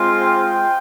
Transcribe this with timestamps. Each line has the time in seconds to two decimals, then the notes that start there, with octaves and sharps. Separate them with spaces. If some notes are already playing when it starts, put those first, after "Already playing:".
Already playing: G#3 C4 F4
0.23 G5